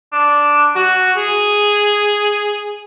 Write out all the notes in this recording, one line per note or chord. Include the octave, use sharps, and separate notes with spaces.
D4
F#4
G#4